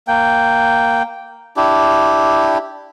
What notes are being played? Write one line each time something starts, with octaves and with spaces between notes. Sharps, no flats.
A#3 G5
D4 E4 G4